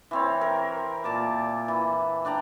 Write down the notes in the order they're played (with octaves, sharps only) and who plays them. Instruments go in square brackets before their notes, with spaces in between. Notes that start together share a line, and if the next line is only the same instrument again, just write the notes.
[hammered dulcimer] E3 C4 C#5
A#4
A#2 A5 D6
E3
D4 D5 G5 A#5